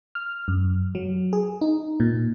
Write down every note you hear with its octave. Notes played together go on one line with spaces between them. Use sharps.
F6
F#2
F#3
G#4
D#4
A#2